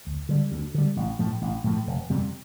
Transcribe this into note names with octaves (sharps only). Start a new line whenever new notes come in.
D2
D3 G3
D2
D3 G3
A1
A2 F3 A3
A1
A2 F3 A3
F1
F2 C3 G3